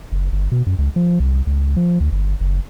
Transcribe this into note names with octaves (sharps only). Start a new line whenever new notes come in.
F#1
G1
B2
F#2
C#2
F3
C2
C#2
F3
D2
G1
F#1